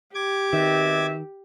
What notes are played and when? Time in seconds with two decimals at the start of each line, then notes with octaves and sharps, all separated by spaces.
0.15 G4 D6 G#6
0.53 B2 D#3 C4 E5